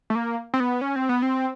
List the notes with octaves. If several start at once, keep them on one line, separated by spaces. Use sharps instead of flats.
A3
A#3
C4
B3
C#4
C4
B3
C4